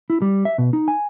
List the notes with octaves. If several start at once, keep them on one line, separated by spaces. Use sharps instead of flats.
E4
G3
E5
B2
D#4
G#5